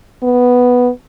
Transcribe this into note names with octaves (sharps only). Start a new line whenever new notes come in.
B3